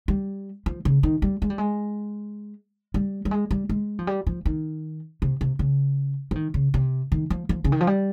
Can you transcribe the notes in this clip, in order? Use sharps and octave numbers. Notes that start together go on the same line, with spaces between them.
G3
F3
C#3
D#3
G3
G#3
G3
G#3
G3
G3
G#3
G3
G#3
F3
G3
F3
D#3
C3
C3
C#3
F3
D#3
C#3
C3
D#3
F3
F3
C#3
D#3
F3
G3